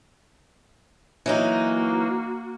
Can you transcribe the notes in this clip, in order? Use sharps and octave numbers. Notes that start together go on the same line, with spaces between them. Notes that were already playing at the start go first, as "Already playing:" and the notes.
E3 F#3 A#3 D#4 F#4